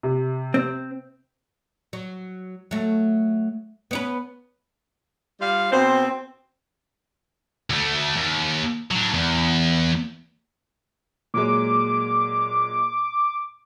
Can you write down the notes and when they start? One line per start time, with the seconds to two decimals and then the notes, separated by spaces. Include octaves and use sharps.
0.03 C3
0.54 C4
1.93 F#3
2.71 F#3 A3
3.91 B3 C#4 B4
5.40 G3 F4 F5
5.72 B2 C4 C5
7.70 D2 A3
8.17 D#2
8.91 F#3 D4
9.14 E2
11.34 A#2 F#3 G#3 D6